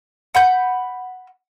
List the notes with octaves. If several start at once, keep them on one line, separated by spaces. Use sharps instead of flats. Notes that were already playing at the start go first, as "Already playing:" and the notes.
F#5 B5 G6